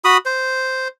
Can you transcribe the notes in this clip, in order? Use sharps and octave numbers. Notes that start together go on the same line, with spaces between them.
F#4 B5 D#6
C5